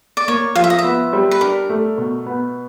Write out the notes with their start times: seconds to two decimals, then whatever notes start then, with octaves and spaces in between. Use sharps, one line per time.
0.17 D5
0.28 A#3 C#5
0.55 F3 F5
0.64 E5
0.70 D#5
0.79 E5
0.84 B3
1.13 G3
1.31 B4
1.41 D4 A#4
1.70 A3
1.98 B2
2.26 B3